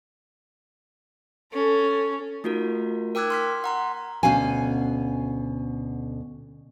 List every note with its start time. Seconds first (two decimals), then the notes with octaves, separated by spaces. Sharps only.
1.53 C#4 A4
2.44 A3 D#4 F4 F#4 A#4
3.15 A#4 G5 D6 E6 F#6 G#6
3.30 C6 F6 B6
3.64 F#5 A#5 C6
4.23 D2 B2 C#4 F#4 F5 G#5